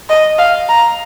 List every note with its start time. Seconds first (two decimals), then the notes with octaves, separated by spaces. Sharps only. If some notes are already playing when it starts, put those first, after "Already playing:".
0.09 D#5
0.38 F5
0.69 A#5